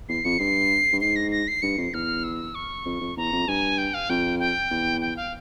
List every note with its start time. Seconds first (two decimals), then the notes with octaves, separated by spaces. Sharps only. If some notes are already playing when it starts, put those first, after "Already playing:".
0.08 E2 C7
0.25 F2 C#7
0.39 G2 C7
0.93 G2
1.01 G#2 C7
1.16 A#6
1.31 A#6
1.48 C7
1.62 G2 C#7
1.78 F2 C7
1.94 E2 F6
2.24 E6
2.55 C#6
2.86 F2
3.01 F2
3.17 E2 A#5
3.32 F2
3.48 G2 G#5
3.78 G5
3.94 F5
4.09 F2 G5
4.40 G5
4.71 E2
5.01 G5
5.17 F5